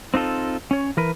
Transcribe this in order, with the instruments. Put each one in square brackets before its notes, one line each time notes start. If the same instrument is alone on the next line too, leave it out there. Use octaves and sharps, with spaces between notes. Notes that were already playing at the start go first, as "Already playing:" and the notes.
[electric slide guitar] C4 D#4 F4 A4
C#4 C#5
E3 A#4 B4